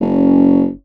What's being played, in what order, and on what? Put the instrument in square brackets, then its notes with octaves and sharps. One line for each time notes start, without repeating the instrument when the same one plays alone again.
[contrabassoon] F#1 [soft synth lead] C#4